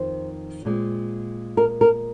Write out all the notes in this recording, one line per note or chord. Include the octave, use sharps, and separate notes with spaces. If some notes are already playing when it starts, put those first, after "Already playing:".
Already playing: F2 D#3 C5
A#2 G#3 C4
A#4
A#4